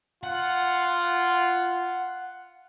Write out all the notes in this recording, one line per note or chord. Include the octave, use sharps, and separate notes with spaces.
F4 F#5